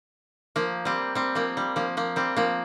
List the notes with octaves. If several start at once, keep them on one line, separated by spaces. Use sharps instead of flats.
F3 A#3
G3 C4
G3 C4
F3 A#3
G3
F3 A#3
F3 A#3
G3 C4
F3 A#3